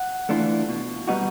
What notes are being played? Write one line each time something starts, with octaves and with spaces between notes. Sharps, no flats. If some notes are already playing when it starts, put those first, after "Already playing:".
Already playing: F#5
E3 A3 D4 F4
B2
G3 B3 D#4 F#4